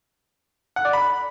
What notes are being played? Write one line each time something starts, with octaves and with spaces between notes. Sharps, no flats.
F#5
D5
B5